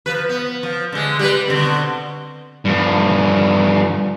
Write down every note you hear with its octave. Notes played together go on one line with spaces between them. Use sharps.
F3 B4
B3
F3
D3 G#3
G3 B4
B2 D3 C4
G2 F3